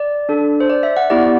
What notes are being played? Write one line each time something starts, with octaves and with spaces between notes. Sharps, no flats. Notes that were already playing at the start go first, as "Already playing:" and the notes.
Already playing: D5
D4 A4
C5
D5
E5
F#5
B3 E4 G4 D5